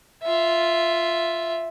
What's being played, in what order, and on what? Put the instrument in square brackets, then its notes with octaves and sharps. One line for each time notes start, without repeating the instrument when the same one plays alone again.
[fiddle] F4 E5